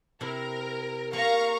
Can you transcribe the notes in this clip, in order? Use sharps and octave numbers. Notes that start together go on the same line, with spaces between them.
C3 E4 A#4
A#3 F5 A#5 C#6